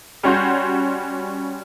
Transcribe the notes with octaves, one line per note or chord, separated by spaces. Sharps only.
G3 C#4 F#4 C6 G6